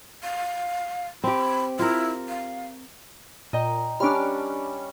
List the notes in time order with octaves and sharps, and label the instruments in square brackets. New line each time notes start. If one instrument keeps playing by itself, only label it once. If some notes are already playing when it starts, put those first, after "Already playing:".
[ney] F5
[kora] C4 G4 [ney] B5
[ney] E4 [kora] F4 A#4
[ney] F5
[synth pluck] A#2 [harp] D#5 G5 A#5
[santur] G3 C#4 D5 [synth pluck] D4 F6